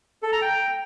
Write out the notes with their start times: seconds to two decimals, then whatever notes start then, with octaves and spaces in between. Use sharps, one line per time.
0.23 A4
0.32 A#5
0.42 G5